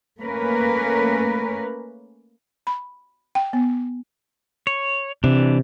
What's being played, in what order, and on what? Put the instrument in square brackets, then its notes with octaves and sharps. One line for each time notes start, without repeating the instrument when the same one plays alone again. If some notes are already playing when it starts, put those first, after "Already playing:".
[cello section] A3 A#3 C#4 A#4 B4
[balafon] B5
G5
B3
[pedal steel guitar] C#5
[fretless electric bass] C3 [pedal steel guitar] E3 D4